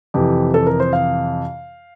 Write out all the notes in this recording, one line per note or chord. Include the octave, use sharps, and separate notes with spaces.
F2 C3 E3 G4
A4
A#4
C5
F5